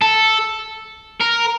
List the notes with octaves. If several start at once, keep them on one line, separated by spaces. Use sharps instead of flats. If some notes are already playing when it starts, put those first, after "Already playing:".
A4
A#4